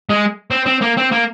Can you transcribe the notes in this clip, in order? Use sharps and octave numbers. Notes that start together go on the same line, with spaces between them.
G#3
C4
C4
A#3
C4
A#3